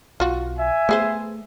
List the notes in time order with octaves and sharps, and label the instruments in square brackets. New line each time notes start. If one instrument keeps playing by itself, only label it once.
[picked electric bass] B1 [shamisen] F4 F#4
[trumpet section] E5 G#5
[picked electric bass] A3 [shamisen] B3 G#4 C5